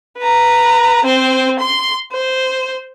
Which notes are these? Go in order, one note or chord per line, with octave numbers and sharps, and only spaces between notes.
B4 A#5
C4 C5
C6
C5